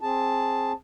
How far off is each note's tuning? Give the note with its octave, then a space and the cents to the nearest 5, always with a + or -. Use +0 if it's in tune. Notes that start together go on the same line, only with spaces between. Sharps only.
C4 +15 G#4 +0 A5 +0